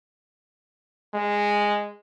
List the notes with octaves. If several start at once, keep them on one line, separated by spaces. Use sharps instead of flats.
G#3